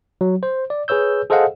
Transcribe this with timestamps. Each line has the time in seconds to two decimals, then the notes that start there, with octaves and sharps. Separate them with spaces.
0.21 F#3
0.43 C5
0.70 D5
0.88 G#4 B4 C#5 E6 G6
1.30 G#4 A4 C5 D#5 F5 F#5